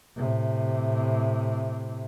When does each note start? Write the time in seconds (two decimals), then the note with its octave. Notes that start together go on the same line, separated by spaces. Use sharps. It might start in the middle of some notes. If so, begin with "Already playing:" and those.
0.17 A2 C3